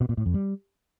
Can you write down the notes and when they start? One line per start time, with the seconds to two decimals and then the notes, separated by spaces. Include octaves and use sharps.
0.01 B2
0.09 A#2
0.17 A2
0.26 F2
0.34 G3